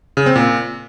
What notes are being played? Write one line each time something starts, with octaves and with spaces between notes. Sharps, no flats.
C#3
C4
A#2